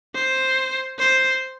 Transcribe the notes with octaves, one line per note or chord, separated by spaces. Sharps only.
C5
C5